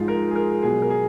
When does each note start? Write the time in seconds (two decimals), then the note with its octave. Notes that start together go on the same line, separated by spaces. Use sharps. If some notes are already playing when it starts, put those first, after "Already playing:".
Already playing: G#2 F3 G#3 F4
0.08 A#4
0.31 G#4
0.36 A#4
0.63 B2 F#3 G#4
0.82 A#4
0.90 G#4